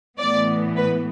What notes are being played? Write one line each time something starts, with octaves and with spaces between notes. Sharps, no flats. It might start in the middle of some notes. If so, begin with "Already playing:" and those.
A2 E3 B3 D5
B4